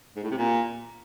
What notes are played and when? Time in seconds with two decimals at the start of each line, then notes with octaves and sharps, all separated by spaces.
0.16 G#2
0.23 A2
0.31 C3
0.38 A#2